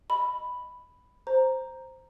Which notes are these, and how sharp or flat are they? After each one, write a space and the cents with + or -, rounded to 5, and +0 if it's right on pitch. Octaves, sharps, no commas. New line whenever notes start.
D#5 +0 B5 +5
C5 +0 A#5 +0